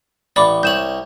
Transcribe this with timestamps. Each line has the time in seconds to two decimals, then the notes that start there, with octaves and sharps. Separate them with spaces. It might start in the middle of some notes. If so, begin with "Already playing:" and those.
0.36 A1 D5 B5 C#6 D6
0.63 C2 C#5 G6 E7 F#7